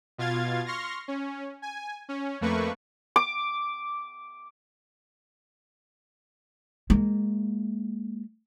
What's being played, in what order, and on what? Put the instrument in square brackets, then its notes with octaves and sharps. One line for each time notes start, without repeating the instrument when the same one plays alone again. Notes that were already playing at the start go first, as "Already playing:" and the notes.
[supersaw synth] B2 F4 F5 G#6 A6
C6 C#6 F6 A#6
C#4
G#5
C#4
F2 A3 A#3 B4 C#6
[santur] D6
[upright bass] G#3 A#3